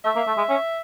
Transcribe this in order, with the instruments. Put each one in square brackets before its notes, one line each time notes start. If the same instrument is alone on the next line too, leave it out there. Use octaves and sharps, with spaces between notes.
[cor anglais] A3 [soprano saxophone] E5
[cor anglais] A#3
A3
G#3
C#4